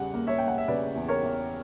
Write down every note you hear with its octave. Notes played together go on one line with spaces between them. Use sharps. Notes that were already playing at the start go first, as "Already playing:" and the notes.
Already playing: E2 C#3 G3 F#5
A#3
C#5 E5
A#3 G5
F#5
E5
C#3 B4 D5
E2
A#4 C#5
E2